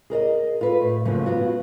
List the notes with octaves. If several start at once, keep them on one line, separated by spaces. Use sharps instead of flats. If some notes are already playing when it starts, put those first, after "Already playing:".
G#4 A#4 D5 D#5
F4 A4 B4
A2
G#2 C#3 F3 F#3 A3 A#3
B3 F4 F#4